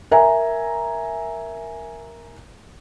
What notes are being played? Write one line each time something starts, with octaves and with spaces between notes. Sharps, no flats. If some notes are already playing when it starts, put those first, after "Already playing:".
A#4 E5 G#5 A#5